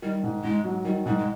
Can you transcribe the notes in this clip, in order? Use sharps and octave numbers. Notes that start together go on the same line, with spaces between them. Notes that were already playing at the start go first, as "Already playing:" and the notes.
D#3 G3
G#2
G#2 G#3
F#3
D#3 G3
G#2 G3
G#3